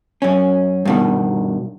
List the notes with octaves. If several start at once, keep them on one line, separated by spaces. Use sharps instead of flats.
F#2 C#4
G2 B2 D#3